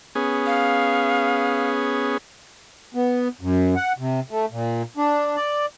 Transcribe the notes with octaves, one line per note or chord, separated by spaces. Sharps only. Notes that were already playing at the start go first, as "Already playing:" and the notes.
B3 C#4 G#4
F5
B3
F#2
F#5
C3
A3
A#2
D4
D5